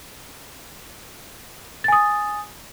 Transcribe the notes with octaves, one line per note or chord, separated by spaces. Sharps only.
G#5 D#6 A6